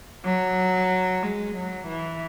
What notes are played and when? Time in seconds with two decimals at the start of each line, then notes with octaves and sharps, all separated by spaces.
0.25 F#3
1.23 G#3
1.55 F#3
1.87 E3